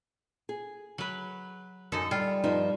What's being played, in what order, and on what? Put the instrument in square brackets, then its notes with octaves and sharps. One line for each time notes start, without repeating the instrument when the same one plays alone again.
[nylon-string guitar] G#4
[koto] F#3 B4
[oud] F#2 [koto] D#4 A4
[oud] G3 [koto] F4
[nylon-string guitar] G2 F3 D#4